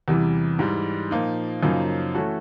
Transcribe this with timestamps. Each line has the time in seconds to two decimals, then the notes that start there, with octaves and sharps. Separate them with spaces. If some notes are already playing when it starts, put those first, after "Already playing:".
0.08 E2 C3 E3 G3
0.59 G#2 E3 G3
1.11 A#2 F3 A#3 D#4
1.63 F#2 C#3 F3 A#3 D#4
2.14 E3 A3 C#4 F#4 A4